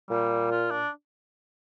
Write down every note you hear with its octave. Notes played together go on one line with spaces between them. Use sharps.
A#2 G3
F4
D4